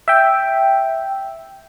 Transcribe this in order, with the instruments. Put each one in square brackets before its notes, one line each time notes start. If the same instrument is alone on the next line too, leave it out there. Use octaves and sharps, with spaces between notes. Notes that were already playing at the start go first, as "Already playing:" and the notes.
[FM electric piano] E5 G5